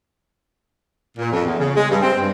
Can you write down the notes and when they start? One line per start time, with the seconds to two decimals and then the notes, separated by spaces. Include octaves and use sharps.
1.17 A#2
1.32 F2
1.45 E2
1.58 C#3
1.76 G#3
1.89 G2
2.02 C4
2.19 G2